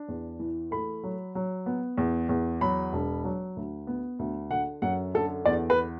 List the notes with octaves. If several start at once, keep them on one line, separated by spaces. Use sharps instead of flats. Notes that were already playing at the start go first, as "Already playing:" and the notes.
Already playing: D4
E2
E3
A3 B5
F#3
F#3
B3
E2
E2
F#3 B5
E1
F#3
D2
B3
D2
D3 F#5
F#2 F#5
D3 A4
E2 D5
B4